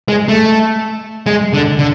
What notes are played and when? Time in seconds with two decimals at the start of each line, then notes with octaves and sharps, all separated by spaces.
0.08 G#3
0.28 A3
1.26 G#3
1.53 D3
1.79 D3